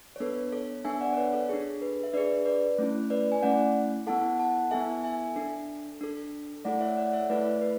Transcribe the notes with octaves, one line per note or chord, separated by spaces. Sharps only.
C#5
B3 D4 A4 B4
A4 C#5
B3 D4 A4 E5 G#5
D5 F#5
C#5
B4 D5
A4 C#5
D4 G#4 A4
B4
E5
D4 G#4 B4 D5
B4 D5
A3 C#4 E4
B4 D5
G#5
A3 C#4 E4 D5 F#5
B3 E4 A4 F#5 A5
F#5 A5
B3 E4 A4 E5 G#5
E5 G#5
D4 A4
D4 A4
A3 E4 A4 D5 F#5
C#5 E5
D5 F#5
C#5 E5
A3 E4 A4 B4 D5
B4